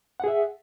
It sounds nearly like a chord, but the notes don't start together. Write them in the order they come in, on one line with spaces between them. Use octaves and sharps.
F#5 G#4 E5